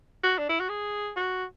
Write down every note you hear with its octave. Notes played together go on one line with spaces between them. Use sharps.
F#4
D4
E4
F#4
G#4
F#4